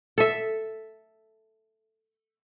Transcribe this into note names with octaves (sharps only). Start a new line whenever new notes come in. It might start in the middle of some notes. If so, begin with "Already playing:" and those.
A4 E5